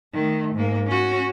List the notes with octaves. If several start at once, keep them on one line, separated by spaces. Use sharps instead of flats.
D#3 A3
G#2 A#3
C#4 F#4